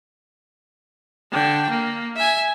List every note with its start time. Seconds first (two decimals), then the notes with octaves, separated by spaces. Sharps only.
1.32 D3 G5
1.70 A#3
2.16 E5 G#5